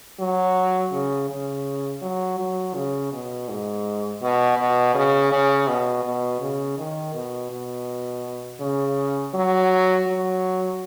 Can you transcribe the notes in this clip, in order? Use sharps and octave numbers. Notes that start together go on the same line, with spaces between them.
F#3
C#3
C#3
F#3
F#3
C#3
B2
G#2
B2
B2
C#3
C#3
B2
B2
C#3
D#3
B2
B2
C#3
F#3
F#3